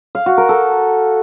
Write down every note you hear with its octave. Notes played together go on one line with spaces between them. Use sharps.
F5
F#4
A#4
A4